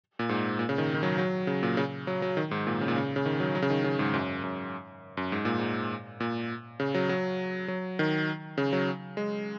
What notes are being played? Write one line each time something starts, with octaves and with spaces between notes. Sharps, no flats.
A#2
G#2
A#2
C#3
D#3
D#3
F#3
F#3
C#3
A#2
C#3
F#3
F#3
D#3
G#2
A#2
C#3
A#2
C#3
C#3
D#3
F#3
F#3
C#3
D#3
C#3
G#2
F#2
F#2
F#2
G#2
A#2
G#2
A#2
C#3
F#3
F#3
F#3
D#3
C#3
F#3
G#3